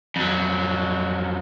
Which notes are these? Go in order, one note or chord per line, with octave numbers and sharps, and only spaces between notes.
F2 F#3